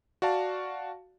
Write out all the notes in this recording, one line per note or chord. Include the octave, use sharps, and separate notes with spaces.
F#4 D5 F5 A5